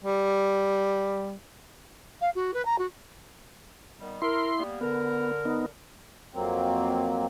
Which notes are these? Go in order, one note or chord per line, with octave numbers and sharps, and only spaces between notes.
G3
F5
F#4
B4
A#5
F#4
D#3 G3 B3
E4 A#4 C6
G3 A#3 B3
D3 B3 A#4
B3 D#4
F2 F#3 A#3 C4